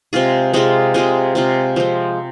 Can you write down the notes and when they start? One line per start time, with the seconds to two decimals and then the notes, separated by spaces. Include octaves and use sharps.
0.13 C3 G#3 F4 G#4
0.53 C3 G#3 F4 G#4
0.94 C3 G#3 F4 G#4
1.35 C3 G#3 F4 G#4
1.76 F3 G#3 C4